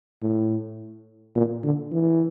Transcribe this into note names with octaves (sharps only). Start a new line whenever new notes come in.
A2
A#2
D3
E3